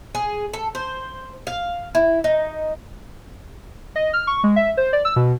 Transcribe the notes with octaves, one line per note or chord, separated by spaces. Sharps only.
G#4
A4
C5
F5
E4
D#4
D#5
F6
C#6
G#3
E5
C5
D5
E6
B2